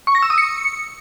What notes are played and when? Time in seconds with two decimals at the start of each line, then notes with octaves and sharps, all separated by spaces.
0.07 C#6
0.15 A#6
0.22 E6
0.30 D#6
0.38 C#7